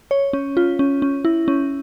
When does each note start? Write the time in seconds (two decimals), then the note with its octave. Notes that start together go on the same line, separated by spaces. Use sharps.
0.11 C#5
0.33 C#4
0.57 F4
0.79 C#4
1.02 C#4
1.25 E4
1.48 C#4